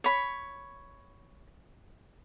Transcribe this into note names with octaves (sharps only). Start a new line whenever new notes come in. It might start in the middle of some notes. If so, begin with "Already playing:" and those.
C#5 B5